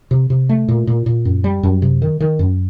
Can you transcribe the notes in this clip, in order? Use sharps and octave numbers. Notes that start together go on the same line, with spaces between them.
C3
C3
A3
A#2
A#2
A#2
F#2
G3
F#2
C3
D#3
D#3
F#2